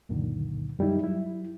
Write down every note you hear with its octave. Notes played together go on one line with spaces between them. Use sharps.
C#2 F#2 A#2 D3 D#3
F#2 G3 D#4 E4
F#3 E4